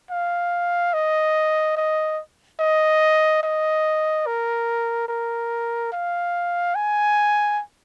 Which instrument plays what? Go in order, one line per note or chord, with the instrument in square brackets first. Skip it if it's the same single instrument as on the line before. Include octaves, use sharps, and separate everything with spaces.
[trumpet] F5
D#5
D#5
D#5
D#5
A#4
A#4
F5
G#5